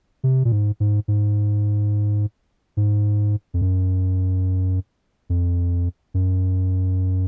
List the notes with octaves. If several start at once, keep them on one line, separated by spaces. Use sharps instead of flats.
C3
A#2
G#2
G#2
G#2
G#2
F2
F#2
F2
F#2